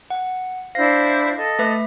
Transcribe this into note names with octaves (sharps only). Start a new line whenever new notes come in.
F#5
D4 E4 C5 F5 A#6 C7
A4 D#5
A3 B4 E5